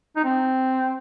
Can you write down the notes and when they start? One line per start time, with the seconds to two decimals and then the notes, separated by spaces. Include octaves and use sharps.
0.16 D#4
0.24 C4